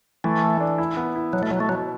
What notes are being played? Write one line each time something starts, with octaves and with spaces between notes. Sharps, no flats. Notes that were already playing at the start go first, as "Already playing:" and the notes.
E3 A3
A4
D4
E4
B3
E4
B2 F#3
A3
B2 F#3
A3
B2 F#3